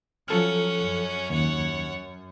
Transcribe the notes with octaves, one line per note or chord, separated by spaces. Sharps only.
F3 F#3 C#4 A4 F#5 F6
F#2
D#2 C#5 F#5